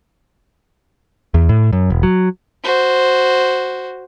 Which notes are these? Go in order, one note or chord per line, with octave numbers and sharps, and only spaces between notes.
E2
A2
F#2
E1
F#3
F#4 C5